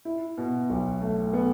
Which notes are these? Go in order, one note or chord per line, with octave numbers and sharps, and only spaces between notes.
E4
B2
B1
A3
B3